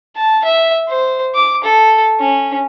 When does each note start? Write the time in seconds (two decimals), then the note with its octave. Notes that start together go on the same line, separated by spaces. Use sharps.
0.16 A5
0.44 E5
0.88 C5
1.34 D6
1.64 A4
2.20 C#4